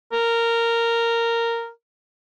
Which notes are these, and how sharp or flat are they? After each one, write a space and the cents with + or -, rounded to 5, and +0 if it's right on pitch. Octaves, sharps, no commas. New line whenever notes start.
A#4 -10